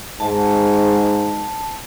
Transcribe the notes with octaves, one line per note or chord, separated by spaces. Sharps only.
G#2 A5